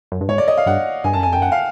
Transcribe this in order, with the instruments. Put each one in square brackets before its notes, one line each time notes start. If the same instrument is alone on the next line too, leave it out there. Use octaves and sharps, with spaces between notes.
[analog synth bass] F#2
G2
[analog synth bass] G#2 [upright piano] C#5
[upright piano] D5
D#5
F5
[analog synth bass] G2 [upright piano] F#5
[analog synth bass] G2 [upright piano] G#5
[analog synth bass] F#2 [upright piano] A5
[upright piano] G#5
[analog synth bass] F2
[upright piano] G5
[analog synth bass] F#2 [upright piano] F#5
[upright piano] F5